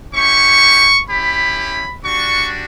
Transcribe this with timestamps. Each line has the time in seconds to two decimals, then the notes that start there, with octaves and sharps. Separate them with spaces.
0.13 C#4 E4 G4 C#6
1.09 C#4 E4 G4 B5
2.04 G3 D4 F#4 C#6